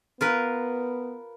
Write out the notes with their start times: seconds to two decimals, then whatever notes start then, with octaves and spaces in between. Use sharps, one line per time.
0.21 B3 F4 A#4 B4